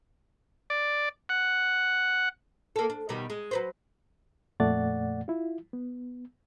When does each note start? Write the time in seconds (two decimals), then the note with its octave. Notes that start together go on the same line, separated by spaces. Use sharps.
0.70 D5
1.29 F#5
2.76 A#3 A4
2.90 D4
3.09 B2 D#3 G3
3.30 G#3
3.51 F#3 B4 C5
4.60 F2 A#2 A3 D5 F#5 A6
5.28 E4 F4
5.73 B3